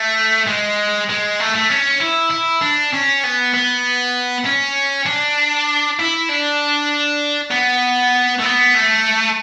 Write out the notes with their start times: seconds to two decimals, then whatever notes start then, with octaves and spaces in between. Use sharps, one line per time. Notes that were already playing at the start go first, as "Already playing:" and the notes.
Already playing: A3
0.47 G#3
1.09 G#3
1.40 A3
1.55 A3
1.70 C#4
2.01 E4
2.31 E4
2.62 D4
2.93 C#4
3.23 B3
3.54 B3
4.46 C#4
5.07 D4
5.99 E4
6.29 D4
7.51 B3
8.39 A3
8.44 B3
8.74 A3